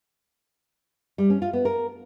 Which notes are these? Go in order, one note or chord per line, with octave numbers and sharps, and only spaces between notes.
G3
C#4
F4
B3
A#4